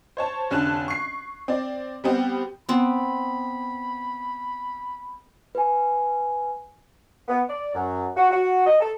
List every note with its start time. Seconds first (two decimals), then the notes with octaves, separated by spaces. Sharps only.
0.17 C5 C#5 A5
0.51 F1 D3 C#4 A5 F#6
0.88 C#6 C7
1.48 C4 D5
2.04 G3 B3 C4 G4
2.69 B3 C4 B5
5.55 B4 G#5
7.28 B3
7.49 D5
7.74 F#2
8.17 F#4
8.31 F#4
8.66 D#5
8.80 A4